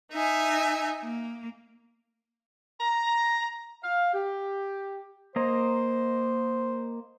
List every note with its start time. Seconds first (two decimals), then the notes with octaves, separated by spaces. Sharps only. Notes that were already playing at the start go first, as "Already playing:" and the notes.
0.11 D#4 E5 G#5
1.02 A#3
2.80 A#5
3.83 F5
4.14 G4
5.36 A#3 C5 D#5 A#5